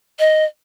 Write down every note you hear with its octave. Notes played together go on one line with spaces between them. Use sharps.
D#5